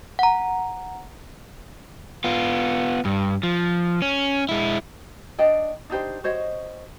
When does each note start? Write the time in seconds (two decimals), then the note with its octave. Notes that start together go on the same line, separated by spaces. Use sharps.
0.19 F#5 A#5
2.24 B3 F4
3.05 G2
3.43 F3
4.02 C#4
4.49 G#3 E4
5.38 D4 D5 D#5 G5
5.90 D4 D#4 G4 C5
6.24 F#4 C5 C#5 D#5